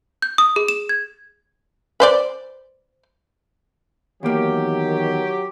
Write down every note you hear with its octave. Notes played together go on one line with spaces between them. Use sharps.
G6
D#6
G#4
E7
G#6
B4 C5 D5
E2 D#3 F#3 A#3 G4